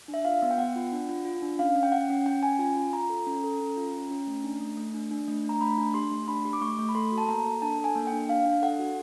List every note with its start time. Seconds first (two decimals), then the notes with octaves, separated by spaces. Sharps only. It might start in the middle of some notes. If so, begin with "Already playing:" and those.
0.08 D4
0.14 E5
0.25 F4 F5
0.42 B3
0.51 G5
0.58 B3 F#5
0.76 F4
0.92 D4
1.09 F4
1.25 F4
1.42 D4
1.59 C#4 F5
1.76 C#4
1.83 G5
1.92 C#4 F#5
2.10 C#4
2.26 C#4 G5
2.43 C#4 G#5
2.59 F4 G#5
2.76 F4
2.93 F4 A#5
3.10 A4
3.27 C#4
3.44 A4
3.60 C#4
3.77 F4
3.93 C#4
4.11 C#4
4.27 A3
4.44 D4
4.61 A3
4.77 A3
4.94 D4
5.11 D4
5.28 A3
5.44 D4
5.49 A#5
5.61 A3 B5
5.78 D4
5.94 G4 C6
6.11 A3
6.28 D4 B5
6.45 G4
6.53 D6
6.61 A3 C#6
6.78 A3
6.89 B5
6.95 A4 C6
7.12 F#4
7.18 A5
7.29 A#3 A#5
7.45 A4
7.62 D4 A5
7.78 A4
7.84 G#5
7.95 A#3
8.07 G5
8.12 D4
8.29 D4 F5
8.45 D4
8.62 A4 F#5
8.79 F#4